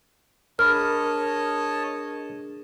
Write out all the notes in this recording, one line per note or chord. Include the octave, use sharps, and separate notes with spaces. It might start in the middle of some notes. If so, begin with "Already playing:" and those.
D4 G#4 A#4 C#5 D#5 A5 B5 F6